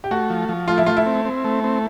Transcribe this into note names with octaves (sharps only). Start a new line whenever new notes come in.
G4
A3 F#4
F3
F3
A3 F4
E4
A3 F4
E4
C4
C4
A3
C4